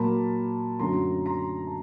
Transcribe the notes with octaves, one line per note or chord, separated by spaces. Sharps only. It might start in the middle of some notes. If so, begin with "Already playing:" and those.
Already playing: A#2 F#3 A#3 A5 B5
F#2 D3 F#3 A3 A#5 C6
A#5 C6
A5